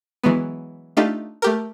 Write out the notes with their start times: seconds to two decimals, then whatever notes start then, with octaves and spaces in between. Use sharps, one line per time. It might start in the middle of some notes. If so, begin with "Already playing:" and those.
0.23 E3 F#3 G#3 B3
0.97 A3 D4 D#4 F4 G4
1.42 A3 G4 A#4